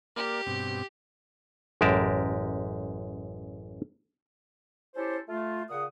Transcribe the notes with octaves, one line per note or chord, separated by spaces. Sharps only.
A#3 G4 A#4 D5
G2 B2 C4
A1 F#2 G#3 G4 A#4 A5
C#4 E4 G4 A4 C5
A3 F4
A#2 C#3 F#5 D#6